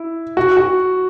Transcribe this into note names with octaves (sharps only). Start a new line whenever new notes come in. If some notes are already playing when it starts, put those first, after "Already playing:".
Already playing: E4
F#4
F#4